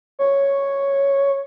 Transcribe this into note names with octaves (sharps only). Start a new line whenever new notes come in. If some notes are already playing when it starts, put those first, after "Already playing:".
C#5